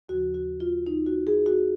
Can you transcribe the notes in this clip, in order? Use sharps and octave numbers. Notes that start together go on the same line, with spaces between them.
D#2 C#3 F3 F#4
F#4
F4
D#4
F#4
G#4
F#4